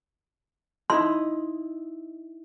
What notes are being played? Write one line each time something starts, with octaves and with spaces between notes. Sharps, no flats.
D#4 E4 D#5 C6